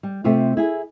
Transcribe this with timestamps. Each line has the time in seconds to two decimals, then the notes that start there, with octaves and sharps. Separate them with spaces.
0.03 G3
0.24 C3 A3 C4 F4
0.57 E4 G#4